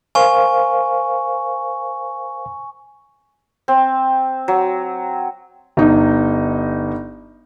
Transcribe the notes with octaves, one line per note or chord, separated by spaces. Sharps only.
A#4 C5 F5 G#5 C#6
C4
F#3
G1 D#4